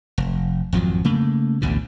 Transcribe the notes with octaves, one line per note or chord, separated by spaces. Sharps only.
F1
G#1 F2 F3 F#3
C#3 A3 A#3
A1 D2 B2 D3